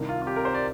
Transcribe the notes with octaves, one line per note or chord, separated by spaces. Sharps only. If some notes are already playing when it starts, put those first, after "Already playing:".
Already playing: C2 C3 D#3
F4
F4
G4
A#4
C5
D5